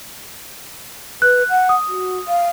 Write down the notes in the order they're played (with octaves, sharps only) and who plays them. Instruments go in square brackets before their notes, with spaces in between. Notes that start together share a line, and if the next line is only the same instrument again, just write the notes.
[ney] B4 [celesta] F#6
[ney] F#5
[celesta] D#6
[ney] F#4
F5